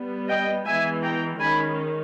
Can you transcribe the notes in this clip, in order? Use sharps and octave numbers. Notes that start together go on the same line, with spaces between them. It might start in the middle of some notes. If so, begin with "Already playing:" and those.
Already playing: G3 B3
D#5 G5
E3 G#3 B3 E5 G#5
G5 A#5
D#3 G#3 C#4 G#5 B5